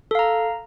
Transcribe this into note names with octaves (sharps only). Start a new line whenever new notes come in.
A4 F5 A#5